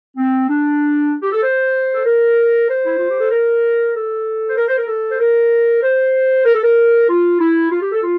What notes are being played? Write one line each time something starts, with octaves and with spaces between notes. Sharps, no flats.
C4
D4
G4
A4
C5
A4
A#4
C5
E4
F4
G4
A4
A#4
A4
C5
A#4
C5
A#4
A4
C5
A#4
C5
A#4
A4
A#4
F4
E4
F4
G4
A4
F4